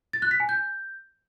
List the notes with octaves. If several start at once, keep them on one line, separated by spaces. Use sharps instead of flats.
A6
F#6
B6
G#5
G6